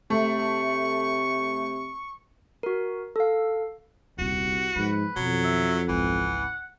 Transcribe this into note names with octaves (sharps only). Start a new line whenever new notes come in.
C3 A3 C#6
F#4 A#4
A4 F5
D#1 C2 D#4 F#4
G#2 F3 B4
F2 B2 D#3 F#3
E5
G#1 C#2 E3 F#5